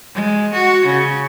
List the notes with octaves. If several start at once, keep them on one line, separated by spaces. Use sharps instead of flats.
G#3
F#4
C#3